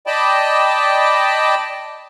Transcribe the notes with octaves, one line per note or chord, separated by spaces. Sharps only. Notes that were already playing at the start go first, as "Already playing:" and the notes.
D5 D#5 G5 A5 B5